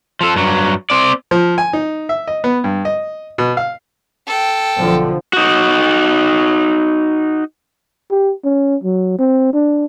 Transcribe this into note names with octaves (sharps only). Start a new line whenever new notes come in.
F3 A4
G2 F#3
C4 D5
F3
G#5
D#4
E5
D#5
B3
G2
D#5
B2
F5
A4 G5
B1 D3 F3
D#4 F#4
G4
C#4
F#3
C4
D4